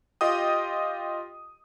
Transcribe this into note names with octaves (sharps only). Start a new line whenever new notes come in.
F4 G4 D#5 G5 D#6